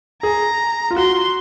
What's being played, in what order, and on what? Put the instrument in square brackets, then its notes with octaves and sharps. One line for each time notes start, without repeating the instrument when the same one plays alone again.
[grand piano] G#4 [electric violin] A#5
[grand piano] F4
[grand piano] F#4 [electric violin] C6